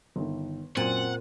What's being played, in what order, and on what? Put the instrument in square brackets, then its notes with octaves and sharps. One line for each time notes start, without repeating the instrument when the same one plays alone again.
[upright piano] G1 D#3
[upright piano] F#2 D#7 [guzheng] A#2 [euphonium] C4 [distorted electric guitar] F#5